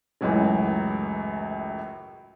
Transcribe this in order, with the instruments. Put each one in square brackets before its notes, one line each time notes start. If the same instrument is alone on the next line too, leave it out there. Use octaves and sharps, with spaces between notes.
[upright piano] C#2 F#2 A2 E3 F#3 G#3